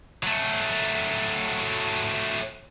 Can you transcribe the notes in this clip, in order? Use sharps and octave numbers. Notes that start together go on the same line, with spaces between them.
F#3 A3